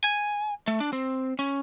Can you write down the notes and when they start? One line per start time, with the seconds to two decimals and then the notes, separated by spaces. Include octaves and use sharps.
0.04 G#5
0.68 A3
0.80 D4
0.93 C4
1.39 C#4